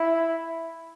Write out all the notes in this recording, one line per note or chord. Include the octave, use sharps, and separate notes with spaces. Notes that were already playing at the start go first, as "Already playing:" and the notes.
Already playing: E4